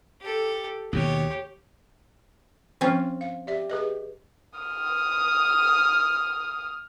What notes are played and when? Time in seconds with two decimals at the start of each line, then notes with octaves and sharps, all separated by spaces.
0.21 G4 A4
0.93 D#2 B2 D#3 G4 C#5
2.81 F3 C4 C#4 F4 G#5
3.21 F5
3.47 G4 D5 E5
3.70 G#4 B4 D#5
4.59 D#6 F6